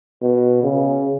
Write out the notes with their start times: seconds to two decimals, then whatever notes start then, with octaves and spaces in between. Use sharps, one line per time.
0.21 B2
0.63 C#3